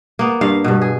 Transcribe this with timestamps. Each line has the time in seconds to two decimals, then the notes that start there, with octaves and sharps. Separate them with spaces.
0.19 A#3 B3
0.41 G2 F5
0.64 G2 B2
0.81 G#4